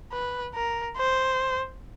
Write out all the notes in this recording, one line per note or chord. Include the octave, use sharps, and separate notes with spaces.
B4
A#4
C5